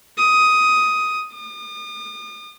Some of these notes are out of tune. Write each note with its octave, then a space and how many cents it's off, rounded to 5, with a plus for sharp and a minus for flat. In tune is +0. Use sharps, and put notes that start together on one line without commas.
D#6 +10
D#6 -45